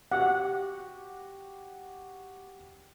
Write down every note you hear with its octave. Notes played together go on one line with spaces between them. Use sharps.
F#4 G4 F#5